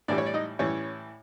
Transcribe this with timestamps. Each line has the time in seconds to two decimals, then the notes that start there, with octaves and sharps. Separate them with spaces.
0.08 A2 E3 G3 D4 D5
0.18 C#5
0.26 D5
0.34 D#4 D#5
0.59 A2 E3 G3 C#4 C#5